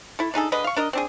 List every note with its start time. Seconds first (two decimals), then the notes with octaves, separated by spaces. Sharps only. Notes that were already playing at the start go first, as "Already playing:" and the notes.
0.19 E4 A4
0.34 D4 D#4 G#4 A4
0.52 D3 G#3 B4 D#5
0.64 F5 C#6
0.76 D4 A#4 D#5
0.93 C4 D4 G#4